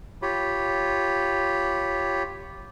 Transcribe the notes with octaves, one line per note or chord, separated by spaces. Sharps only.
F4 G4 C#5 B5